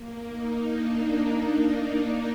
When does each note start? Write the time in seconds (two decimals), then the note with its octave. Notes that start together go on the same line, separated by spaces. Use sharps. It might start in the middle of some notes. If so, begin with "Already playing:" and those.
Already playing: A#3
0.28 D#4
0.67 D4